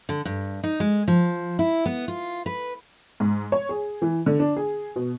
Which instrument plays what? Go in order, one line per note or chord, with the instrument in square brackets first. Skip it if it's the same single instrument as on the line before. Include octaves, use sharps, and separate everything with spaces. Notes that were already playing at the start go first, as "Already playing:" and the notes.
[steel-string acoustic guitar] D3
G2
D#4
G#3
F3
E4
B3
F4
B4
[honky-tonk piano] G#2
C#5
G#4
E3
D3
D4
G#4
B2